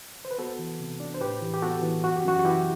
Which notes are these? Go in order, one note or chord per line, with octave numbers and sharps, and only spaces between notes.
C5
B4
B3 F#4 A4
E3
C3
D4
C5
A2 G4 B4
E3
G4
B3 F#4 A4
E3
F#2 F#4
G4
F#2 F#4
F#4
E3 E4 G4